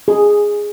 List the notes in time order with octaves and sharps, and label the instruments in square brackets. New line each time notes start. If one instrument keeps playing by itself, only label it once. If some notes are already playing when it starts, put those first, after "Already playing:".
[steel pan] G#4